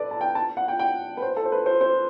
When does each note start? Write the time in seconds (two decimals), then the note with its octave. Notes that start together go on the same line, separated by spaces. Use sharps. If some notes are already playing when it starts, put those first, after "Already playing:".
Already playing: A4 B4 D5
0.11 A5
0.21 G5
0.35 A5
0.57 F#5
0.68 G5
0.79 G5
1.17 B4
1.22 C5
1.37 A4
1.45 C5
1.52 B4
1.66 C5
1.81 C5